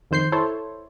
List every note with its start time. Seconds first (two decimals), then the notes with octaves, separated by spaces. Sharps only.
0.11 F2 D#3 C5 G6 C7
0.32 E4 A4 C5 C#5